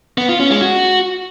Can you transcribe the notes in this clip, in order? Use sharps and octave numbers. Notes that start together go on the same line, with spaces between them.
B3
F4
C#4
G#3
F#4